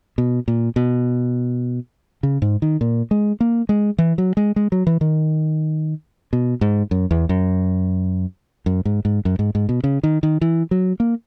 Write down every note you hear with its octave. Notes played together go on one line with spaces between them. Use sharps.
B2
A#2
B2
C#3
G#2
D#3
A#2
G#3
A#3
G#3
E3
F#3
G#3
G#3
F#3
E3
D#3
B2
G#2
F#2
E2
F#2
F#2
G#2
G#2
F#2
G#2
G#2
B2
C#3
D#3
D#3
E3
F#3
A#3